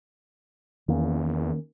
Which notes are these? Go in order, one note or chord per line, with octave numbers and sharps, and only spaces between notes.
E2 D#3 A#3 C#4